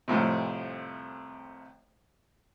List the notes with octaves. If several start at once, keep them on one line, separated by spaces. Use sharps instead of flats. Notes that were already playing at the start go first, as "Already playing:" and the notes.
C2 F2 A2 C3